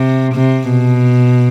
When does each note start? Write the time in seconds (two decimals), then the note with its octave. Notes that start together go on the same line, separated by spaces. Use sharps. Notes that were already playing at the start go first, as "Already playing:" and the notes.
Already playing: C3
0.35 C3
0.70 B2